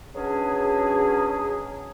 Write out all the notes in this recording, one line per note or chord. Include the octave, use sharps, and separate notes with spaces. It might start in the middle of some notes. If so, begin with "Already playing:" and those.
B2 F#3 C#4 D4 G#4